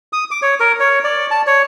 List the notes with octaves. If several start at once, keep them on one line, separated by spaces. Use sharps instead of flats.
D#6
D6
C#5
A#4
C#5
D5
A5
C#5